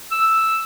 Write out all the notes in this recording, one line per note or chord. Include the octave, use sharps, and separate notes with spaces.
E6